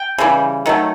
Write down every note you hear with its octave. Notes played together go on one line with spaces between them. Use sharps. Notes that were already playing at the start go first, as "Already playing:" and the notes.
Already playing: G5
C#3 E3 G3
D#3 F#3 A3